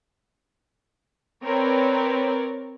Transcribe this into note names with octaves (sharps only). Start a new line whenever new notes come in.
C4 A#4 B4 C#5 D5